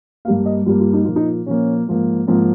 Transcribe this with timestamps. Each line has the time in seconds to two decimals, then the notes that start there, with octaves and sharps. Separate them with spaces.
0.25 G2 G3 A#3 F5
0.45 D#5
0.66 G2 G3 A#3 F4
0.80 F4
0.93 D#4
1.04 A#2 F3 A#3 F4
1.16 D#4
1.46 A#2 F3 A#3 C#4
1.87 G#2 F3 A#3
2.27 G#2 F3 A#3 C4